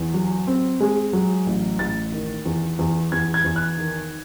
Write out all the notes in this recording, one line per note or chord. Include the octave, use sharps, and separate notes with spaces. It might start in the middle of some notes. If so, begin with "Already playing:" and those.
Already playing: E2
F#3
C4
G#3
F#3
A1
A1 A6
D#3
E2
E2
E2 G#6
G#6
E2
F#6
D#3